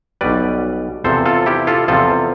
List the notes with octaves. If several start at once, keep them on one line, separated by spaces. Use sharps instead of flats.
B1 B2 G3 B4 D5
E2 C3 F3 A4 C5
F4 A4
E4 G4
F4 A4
E2 C3 F3 F4 A4